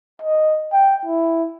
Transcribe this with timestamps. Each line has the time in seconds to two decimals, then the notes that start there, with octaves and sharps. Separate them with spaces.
0.22 D#5
0.73 G5
1.05 E4